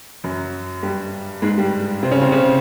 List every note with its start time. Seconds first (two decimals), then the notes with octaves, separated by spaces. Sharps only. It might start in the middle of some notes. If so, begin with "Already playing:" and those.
0.24 F#2 F#3
0.83 G2 G3
1.42 G#2 G#3
1.58 G2 G3
2.03 C3 C4
2.11 C#3 C#4
2.21 C3 C4
2.32 C#3 C#4